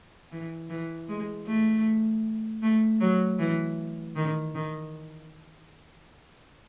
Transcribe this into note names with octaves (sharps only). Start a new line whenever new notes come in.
E3
E3
G#3
A3
A3
F#3
E3
D#3
D#3